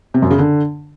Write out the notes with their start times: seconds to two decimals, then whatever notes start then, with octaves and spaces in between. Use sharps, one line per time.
0.14 C3
0.22 F#2
0.30 C#3
0.39 D3